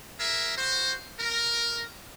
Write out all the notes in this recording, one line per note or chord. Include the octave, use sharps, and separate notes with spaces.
G#4 A#4 E5
F#4 C5
A#4